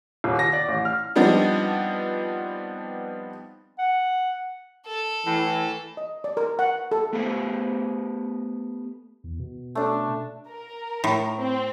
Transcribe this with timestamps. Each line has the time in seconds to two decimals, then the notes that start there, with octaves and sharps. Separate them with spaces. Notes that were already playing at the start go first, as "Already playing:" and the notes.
0.24 D#1
0.39 A#6
0.53 D5
0.68 A1
0.85 F6
1.16 F3 G3 B3 C4 D4 D#4
3.79 F#5
4.87 A4
5.27 A2 E3
5.97 D#5
6.24 D5
6.37 A#4
6.59 F#5
6.92 A4
7.13 A3 B3 G4 B4 C5 F5
9.24 E2
9.40 B2
9.75 A3 D4
10.49 A#4
11.04 A2
11.37 C4